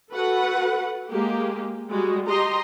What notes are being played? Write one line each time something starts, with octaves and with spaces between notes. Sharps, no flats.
F#4 A4 B4 F#5
G#3 A#3 G4
G3 G#3 F#4
G4 D#5 A#5 C6